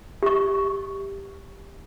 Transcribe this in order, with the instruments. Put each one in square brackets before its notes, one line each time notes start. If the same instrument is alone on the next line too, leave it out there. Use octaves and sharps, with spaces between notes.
[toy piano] G4 C#6